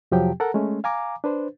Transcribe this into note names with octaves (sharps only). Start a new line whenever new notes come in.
F2 C3 F3 F#3 G4 G5
A4 A#4 F#5 A#5
G#3 A3 C#4
F5 G#5 A#5 D6
D4 B4 C5